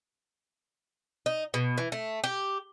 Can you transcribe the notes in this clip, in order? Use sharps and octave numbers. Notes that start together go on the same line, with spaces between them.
D#4
B2
E3
A3
G4